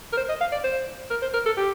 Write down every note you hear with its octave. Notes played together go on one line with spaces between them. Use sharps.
A#4
C5
D#5
F5
D5
C5
A#4
C5
A#4
A4
G4